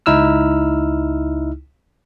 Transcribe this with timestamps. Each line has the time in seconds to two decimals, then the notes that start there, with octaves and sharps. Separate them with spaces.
0.06 C#2 D#4 E4 E6 F6